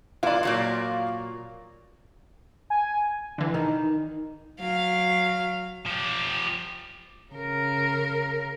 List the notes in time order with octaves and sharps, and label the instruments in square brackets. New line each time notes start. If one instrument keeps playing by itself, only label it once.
[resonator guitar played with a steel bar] E3 [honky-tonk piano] F4 D5
[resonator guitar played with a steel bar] A#2 F#3 A#3
[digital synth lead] G#5
[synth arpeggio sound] D3 E3
[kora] D#3
[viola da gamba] F#3 [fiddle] F5
[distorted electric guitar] F3 G4
[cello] C#3 A#4